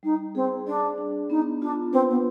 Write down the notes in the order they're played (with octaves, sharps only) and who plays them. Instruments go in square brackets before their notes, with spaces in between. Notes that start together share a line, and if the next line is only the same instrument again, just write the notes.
[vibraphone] G3 [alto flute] D#4
[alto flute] C4 [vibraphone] G#4
[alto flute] D4 [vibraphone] D5
[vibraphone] D4
[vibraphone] B3 [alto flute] D#4
[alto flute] D4 [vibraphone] F4
[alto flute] C4 [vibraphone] B4
[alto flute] B3